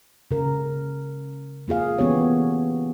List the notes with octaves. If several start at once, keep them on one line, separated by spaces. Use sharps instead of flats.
C#3 A#4
A#3 F4 G#4 F5
E3 A#3 B3 C#4 G4 C#5